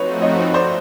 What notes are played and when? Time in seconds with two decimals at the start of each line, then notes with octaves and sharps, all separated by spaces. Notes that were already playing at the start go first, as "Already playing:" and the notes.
Already playing: F3 A3 C4 D#4 F#4 B4 C#5
0.22 C#5 D#5
0.54 C5 D5